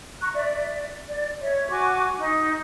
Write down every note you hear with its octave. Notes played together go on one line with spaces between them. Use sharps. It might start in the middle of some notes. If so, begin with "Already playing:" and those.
A#5 C#6 F#6
D5 E5
D5
C#5 E5
F#4 G#5 C#6 D6
D#4